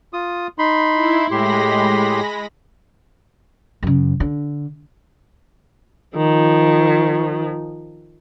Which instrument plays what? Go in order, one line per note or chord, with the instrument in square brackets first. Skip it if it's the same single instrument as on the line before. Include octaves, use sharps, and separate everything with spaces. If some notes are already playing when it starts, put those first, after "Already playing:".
[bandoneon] F4 D#6
D#4 B5 C6
[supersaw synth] E4
[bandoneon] A2 G4 C6 [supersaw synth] G#3 B5 A#6
[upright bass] F#2 C#3
D3
[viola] D#3 F3